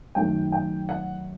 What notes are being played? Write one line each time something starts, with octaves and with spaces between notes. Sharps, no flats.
F#2 D#3 A3 G5
G5
F#5